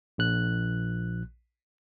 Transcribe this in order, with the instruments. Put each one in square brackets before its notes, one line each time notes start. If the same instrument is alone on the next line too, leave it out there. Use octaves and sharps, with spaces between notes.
[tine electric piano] A#1 F#6